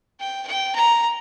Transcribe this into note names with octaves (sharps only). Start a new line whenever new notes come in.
G5
G5
A#5